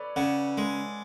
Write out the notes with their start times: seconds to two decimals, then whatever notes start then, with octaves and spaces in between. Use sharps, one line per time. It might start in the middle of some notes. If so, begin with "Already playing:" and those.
Already playing: A4 B4 C#5 D5
0.16 C#3 D5 F#5
0.57 G#3